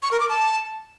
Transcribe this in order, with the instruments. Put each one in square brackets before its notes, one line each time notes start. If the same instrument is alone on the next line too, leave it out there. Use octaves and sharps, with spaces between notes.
[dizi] C#6
A#4
D6
A5